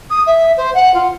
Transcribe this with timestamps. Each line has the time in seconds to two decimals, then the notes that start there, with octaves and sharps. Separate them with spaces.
0.10 D#6
0.26 E5
0.57 C5
0.74 F#5
0.94 F4